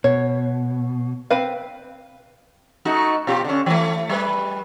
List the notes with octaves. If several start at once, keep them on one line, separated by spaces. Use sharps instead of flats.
B2 C#5
C4 B4 F5
A3 D#4 F#4
B2 F4 G4
D3 C#4
E3 A3
G3 B4